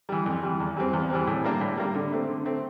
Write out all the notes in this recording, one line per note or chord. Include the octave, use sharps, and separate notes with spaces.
E3 G3
F2
E3 G3
E2
E3 G3 C4
E2
E3 G3 C4
A2
G3 A#3 D4
A2
G3 A#3 D4
D3
A3 C4
D3
A3 C4